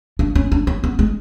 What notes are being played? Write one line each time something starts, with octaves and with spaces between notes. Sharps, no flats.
D4
C#4
D4
C#4
B3
G#3